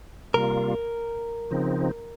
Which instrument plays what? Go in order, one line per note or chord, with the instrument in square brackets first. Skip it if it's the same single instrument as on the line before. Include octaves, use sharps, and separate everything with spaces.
[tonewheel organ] C3 G3 A#3 F4 [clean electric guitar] A#4
[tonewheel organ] C#3 F3 C4 D#4